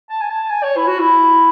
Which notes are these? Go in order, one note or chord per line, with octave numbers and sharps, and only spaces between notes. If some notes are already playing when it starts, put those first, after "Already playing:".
A5
G#5
A5
G#5
C#5
E4
F#4
E4